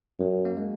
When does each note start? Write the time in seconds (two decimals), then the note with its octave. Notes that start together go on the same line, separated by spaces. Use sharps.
0.20 F#2 F#3
0.45 A#3
0.57 G#3